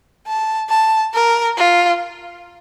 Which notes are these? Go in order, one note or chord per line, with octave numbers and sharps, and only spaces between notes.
A5
A5
A#4
F4